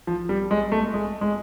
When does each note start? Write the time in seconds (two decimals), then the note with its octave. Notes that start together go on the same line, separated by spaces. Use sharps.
0.07 F3
0.29 G3
0.51 G#3
0.72 A3
0.94 G#3
1.21 G#3